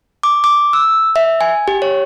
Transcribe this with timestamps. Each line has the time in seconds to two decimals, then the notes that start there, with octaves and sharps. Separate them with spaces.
0.23 D6
0.44 D6
0.73 E6
1.16 E5
1.41 G#5
1.68 G4
1.82 C#5